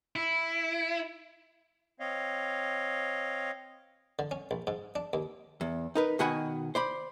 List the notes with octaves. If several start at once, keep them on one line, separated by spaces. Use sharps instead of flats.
E4
C4 C#5 D#5 F5
D3
C#4
A#1
G#2
D4
D#2
E2
D#4 A#4 B4
B2 D#3 F#4 F#5 G#5 B5
C5 D5 B5